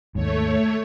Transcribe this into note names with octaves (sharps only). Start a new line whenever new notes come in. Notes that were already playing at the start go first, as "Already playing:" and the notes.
D#2 G#2 A3 C#5